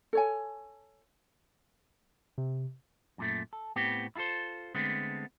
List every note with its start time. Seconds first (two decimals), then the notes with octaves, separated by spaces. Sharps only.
0.13 A4 C#5 G#5
2.38 C3
3.18 F#2 A#2 A3
3.53 A4
3.76 A2 B3 C4 G4
4.16 E4 F4 G#4 A4 C5
4.75 D3 G#3 A3 B3 C4